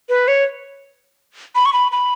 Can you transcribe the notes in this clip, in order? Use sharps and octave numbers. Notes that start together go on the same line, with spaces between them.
B4
C#5
B5
C#6
B5
B5